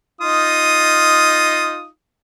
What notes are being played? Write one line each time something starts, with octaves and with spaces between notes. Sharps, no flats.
D#4 F4 D#6